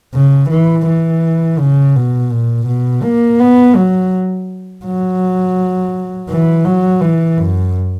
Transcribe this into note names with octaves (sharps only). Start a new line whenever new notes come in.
C#3
E3
E3
C#3
B2
A#2
B2
A#3
B3
F#3
F#3
E3
F#3
E3
F#2